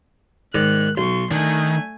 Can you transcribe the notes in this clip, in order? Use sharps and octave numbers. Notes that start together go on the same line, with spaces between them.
G#2 D#3 D5 F#6
B1 C6 C#6
D#3 A3 D4 G#5